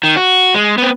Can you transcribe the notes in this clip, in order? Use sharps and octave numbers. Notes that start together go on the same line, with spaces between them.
D#3
F#4
G#3
B3 C4